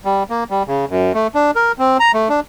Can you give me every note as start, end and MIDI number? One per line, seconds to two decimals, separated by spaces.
0.05 0.23 55
0.30 0.44 58
0.50 0.63 55
0.68 0.85 49
0.89 1.13 42
1.14 1.27 57
1.35 1.51 62
1.56 1.72 70
1.79 1.97 60
2.00 2.12 82
2.14 2.29 57
2.29 2.40 62